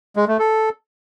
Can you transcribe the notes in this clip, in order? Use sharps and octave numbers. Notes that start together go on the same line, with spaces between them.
G#3
A3
A4